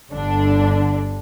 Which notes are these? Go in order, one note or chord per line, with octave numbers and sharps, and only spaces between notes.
G1 D3 D4